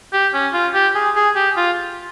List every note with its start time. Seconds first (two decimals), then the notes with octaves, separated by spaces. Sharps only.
0.13 G4
0.34 C#4
0.53 F4
0.74 G4
0.95 G#4
1.16 G#4
1.36 G4
1.57 F4